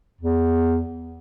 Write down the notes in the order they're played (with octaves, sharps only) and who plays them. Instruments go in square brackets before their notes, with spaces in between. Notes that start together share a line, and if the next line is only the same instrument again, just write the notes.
[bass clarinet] E2